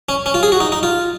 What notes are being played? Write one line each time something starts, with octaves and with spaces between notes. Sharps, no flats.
C#4
C#4
F4
G#4
F#4
D#4
D#4
F4